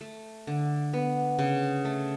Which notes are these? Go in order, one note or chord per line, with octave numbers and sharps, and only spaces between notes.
A3
D3
B3
C#3
A3